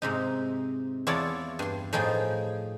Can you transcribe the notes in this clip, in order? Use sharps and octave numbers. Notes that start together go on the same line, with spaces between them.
G#2 C3 D#4
E2 E4 F4 C#5 D5 A5
G2 C6
A2 F3 D#4 G#4 G5